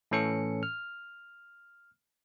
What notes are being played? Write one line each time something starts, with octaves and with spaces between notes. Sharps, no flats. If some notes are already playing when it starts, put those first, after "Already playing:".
A2 E3 C#4 A4 C#7
F6